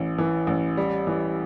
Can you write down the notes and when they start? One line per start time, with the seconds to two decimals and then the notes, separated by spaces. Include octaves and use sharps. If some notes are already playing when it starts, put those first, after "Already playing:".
Already playing: A1 E3
0.19 E3
0.47 A1
0.77 G3
1.07 E3